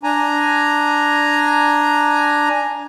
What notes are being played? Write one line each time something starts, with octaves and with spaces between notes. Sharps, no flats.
D4 G#5 A#5